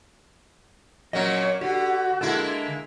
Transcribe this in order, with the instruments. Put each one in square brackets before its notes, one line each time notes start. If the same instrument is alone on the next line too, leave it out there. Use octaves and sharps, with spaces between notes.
[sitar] A#2 F#3 A#4 [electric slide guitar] C#4 D#5 [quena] C#5
[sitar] D3 [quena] F#4 [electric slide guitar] G4
[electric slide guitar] D3 A4 [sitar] G#3 A#3 E4